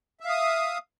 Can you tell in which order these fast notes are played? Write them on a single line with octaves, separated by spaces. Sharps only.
E5 F5 D#6